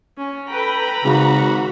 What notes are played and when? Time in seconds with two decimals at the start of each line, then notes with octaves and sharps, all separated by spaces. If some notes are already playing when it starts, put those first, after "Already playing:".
0.18 C#4
0.50 A4 B4 G5 A#5 B5
1.05 G#1 C#3 F#4